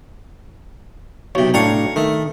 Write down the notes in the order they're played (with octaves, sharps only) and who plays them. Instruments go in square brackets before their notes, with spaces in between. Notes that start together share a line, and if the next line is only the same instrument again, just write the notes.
[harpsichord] B1 C3 [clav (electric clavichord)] C#5
[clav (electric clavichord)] A2 D4 G5 [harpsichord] C#5 F5 A#5
[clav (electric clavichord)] D#3 [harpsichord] A3